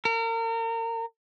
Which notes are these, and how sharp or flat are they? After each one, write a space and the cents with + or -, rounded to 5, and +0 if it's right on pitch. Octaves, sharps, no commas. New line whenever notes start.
A#4 -35